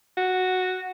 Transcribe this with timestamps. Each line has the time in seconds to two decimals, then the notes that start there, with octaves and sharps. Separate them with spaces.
0.17 F#4